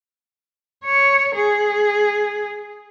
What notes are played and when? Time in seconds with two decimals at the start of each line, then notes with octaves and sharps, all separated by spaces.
0.84 C#5
1.35 G#4